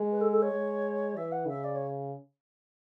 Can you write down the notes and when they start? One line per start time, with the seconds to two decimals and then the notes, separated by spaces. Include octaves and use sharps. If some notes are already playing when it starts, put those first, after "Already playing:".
Already playing: G#3
0.12 B4
0.21 A4
0.31 A4
0.42 C#5
0.53 G#3
1.16 E3 E5
1.32 F#5
1.48 C#3 E5
1.64 D5
1.75 C#5